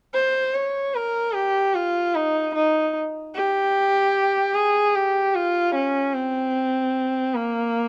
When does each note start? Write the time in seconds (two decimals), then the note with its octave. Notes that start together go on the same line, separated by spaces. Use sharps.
0.14 C5
0.55 C#5
0.95 A#4
1.34 G4
1.74 F4
2.15 D#4
2.55 D#4
3.35 G4
4.55 G#4
4.95 G4
5.35 F4
5.75 C#4
6.14 C4
7.34 A#3